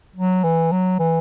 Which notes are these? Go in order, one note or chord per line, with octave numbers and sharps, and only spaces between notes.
F#3
E3
F#3
E3